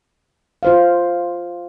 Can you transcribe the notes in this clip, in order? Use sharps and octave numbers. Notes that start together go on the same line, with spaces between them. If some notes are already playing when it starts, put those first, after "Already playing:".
F4 C5 F5